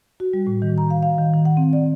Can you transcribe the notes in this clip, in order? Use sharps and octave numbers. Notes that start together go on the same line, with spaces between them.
F#4
G3
A2
D#3
A#5
F5
F5
D#3
D#3
F#5
C4
D5